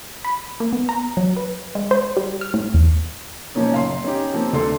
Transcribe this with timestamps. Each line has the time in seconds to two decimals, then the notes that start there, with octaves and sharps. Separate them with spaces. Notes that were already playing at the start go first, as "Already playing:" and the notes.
0.25 B5
0.60 A#3
0.73 B3
0.89 A#5
1.17 F#3
1.36 B4
1.75 G#3
1.91 C5
2.17 G3
2.41 F6
2.54 A2
2.74 E2
3.55 A#2 F3 A#3 C#4 D#4
3.72 F#1 F5 C6
4.04 C#4 D#4 G4
4.34 F3 A#3 C4
4.53 D2 D4 A4 C6